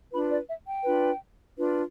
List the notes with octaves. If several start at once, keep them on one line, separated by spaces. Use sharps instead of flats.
D4 F4 B4 B5
D5
E5
G5
D4 F4 B4
D4 F4 B4